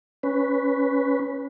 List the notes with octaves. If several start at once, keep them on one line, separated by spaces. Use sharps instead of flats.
C#4 B4